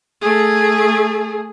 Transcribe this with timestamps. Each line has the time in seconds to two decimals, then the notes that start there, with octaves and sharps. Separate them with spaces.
0.22 A3 G#4